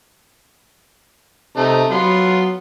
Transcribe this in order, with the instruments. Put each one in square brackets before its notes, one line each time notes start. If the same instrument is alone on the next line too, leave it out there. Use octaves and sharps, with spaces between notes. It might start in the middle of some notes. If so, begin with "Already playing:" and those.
[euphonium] C3 [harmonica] A3 D#4
[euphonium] F#3 [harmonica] B3 F4 C6